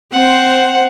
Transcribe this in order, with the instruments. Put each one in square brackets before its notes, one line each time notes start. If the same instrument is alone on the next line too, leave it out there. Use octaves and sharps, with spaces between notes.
[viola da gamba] C4 [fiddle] C5 F#5